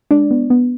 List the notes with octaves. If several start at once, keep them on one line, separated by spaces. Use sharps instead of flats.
G#3 D4 D5
B3
B3